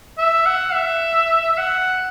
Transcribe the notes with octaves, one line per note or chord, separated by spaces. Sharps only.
E5
F#5
E5
E5
F#5